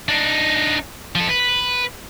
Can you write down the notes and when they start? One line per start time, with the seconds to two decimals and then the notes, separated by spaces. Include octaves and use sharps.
0.09 D4 D#4
1.15 F3 A4
1.29 B4